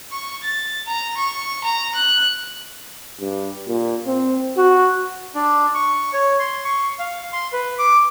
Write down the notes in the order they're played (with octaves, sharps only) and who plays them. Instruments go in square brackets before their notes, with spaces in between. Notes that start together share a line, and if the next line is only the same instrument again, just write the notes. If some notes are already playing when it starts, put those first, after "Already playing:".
[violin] C#6
A6
A#5
C#6
A#5
F#6
[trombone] G2
A#2
C4
F#4
[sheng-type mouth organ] D4
C#6
C#5
C6
C#6
F5
C6
B4
D6